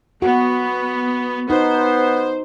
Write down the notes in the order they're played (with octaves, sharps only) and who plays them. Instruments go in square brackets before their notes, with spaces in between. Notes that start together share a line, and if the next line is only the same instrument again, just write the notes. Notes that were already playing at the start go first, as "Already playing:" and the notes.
[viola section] B3 [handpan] F#4
[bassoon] B3 [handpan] D#4 [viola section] C5